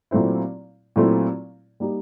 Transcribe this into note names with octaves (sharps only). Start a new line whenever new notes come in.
A#2 F#3 A3 C4 E4
A#2 F#3 A3 C4 E4
G3 A#3 D#4 G4